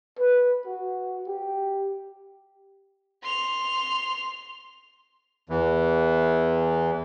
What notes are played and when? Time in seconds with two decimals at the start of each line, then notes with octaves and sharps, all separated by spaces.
0.19 B4
0.66 F#4
1.28 G4
3.23 C6 F7
5.49 E2 E3